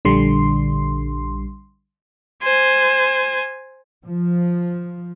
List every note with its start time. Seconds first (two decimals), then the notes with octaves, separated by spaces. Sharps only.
0.05 A#1 D3 G3 C6
2.43 C5 G#5
4.07 F3